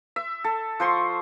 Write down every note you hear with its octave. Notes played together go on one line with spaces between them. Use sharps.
E5
A4
F3 C5 C6 C#6